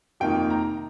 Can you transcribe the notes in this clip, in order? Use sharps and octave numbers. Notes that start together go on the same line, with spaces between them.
F2 C3 D#3 A#3 D#4 G5
A#5